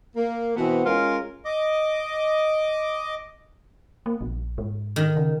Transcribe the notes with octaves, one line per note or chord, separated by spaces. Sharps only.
A#3
B2 E3 B3 C4
G#3 C#4 F4 A#4
D#5 D6
A#3
A#1
G#2
D#3
C#3